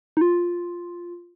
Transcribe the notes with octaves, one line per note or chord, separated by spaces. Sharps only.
D#4
F4